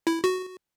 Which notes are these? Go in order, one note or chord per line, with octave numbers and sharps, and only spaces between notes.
E4
F#4